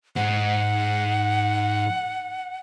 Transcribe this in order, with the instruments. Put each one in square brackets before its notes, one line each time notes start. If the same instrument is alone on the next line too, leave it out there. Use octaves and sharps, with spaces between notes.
[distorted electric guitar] G#2 [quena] F#5